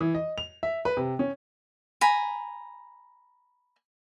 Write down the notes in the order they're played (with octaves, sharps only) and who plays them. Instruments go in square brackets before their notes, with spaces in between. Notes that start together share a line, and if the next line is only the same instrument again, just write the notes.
[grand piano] E3
D#5
F7
E5
B4
C3
C#4
[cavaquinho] G#5 A#5 B5